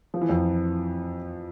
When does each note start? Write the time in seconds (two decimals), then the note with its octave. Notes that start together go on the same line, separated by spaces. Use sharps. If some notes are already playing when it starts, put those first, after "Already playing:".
0.14 F3
0.21 E3
0.29 F2 F3